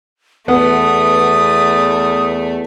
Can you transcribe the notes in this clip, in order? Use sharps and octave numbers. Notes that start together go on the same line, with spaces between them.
E2 A3 B3 D#6